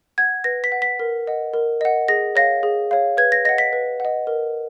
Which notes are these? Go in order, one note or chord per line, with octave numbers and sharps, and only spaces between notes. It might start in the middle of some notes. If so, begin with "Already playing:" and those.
F#5 G#6
B4 A#6
B6
F#5
B6
A#4
D#5 F#5
A#4
D#5 F#5
G#4 A#6
C#5 F5 A#6
G#4
C#5 F5
B4 G#6
A#6
D#5 F#5 A#6
B6
B4
D#5 F#5
A#4